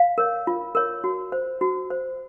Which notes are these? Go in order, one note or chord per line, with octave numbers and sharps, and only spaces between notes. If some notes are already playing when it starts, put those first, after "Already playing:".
Already playing: F5
A#4 C#5
F4
A#4 C#5
F#4
C5
F#4
C5